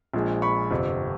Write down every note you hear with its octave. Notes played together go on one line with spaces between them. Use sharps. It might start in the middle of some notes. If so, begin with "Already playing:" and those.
A#1 A#2 F3 G#3
B5 C#6
G1 F2 C3